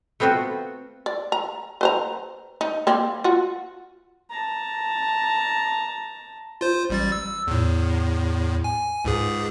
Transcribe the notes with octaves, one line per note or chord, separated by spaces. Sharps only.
A3 B3 C4 F4 F#4
D5
A#5
B4 C5 A#5
D#4
A#3 C4
F4 F#4
A5 A#5
F4 C5
A1 G3 A6
E6
E2 A2
G#5
C#2 G#2 G#4